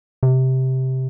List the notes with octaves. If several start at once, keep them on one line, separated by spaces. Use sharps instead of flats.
C3